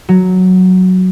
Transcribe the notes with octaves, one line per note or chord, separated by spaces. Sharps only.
F#3